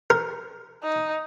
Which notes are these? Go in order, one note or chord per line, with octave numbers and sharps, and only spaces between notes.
A#4
D#4